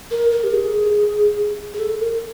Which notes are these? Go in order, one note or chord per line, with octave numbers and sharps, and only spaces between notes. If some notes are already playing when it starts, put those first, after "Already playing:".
A#4
A#4
G4
G#4
G#4
A4
A#4